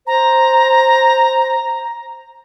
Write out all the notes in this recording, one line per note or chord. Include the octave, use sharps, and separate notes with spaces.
C5 A#5